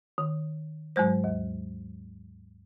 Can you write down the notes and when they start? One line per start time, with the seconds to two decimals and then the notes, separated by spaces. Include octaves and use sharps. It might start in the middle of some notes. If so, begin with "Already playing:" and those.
0.18 D#3
0.96 G#2 F#3 G#3 C5
1.24 D#2